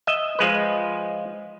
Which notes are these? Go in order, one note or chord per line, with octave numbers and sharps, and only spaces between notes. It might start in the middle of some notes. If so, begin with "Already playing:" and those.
D#5 E5
F3 G#3 B4